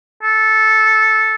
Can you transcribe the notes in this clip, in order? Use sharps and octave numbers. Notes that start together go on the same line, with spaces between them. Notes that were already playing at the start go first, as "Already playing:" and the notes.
A4